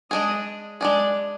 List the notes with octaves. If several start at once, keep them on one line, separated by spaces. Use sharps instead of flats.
G#3 D4 G#4 D#5
G#3 D4 G#4 D5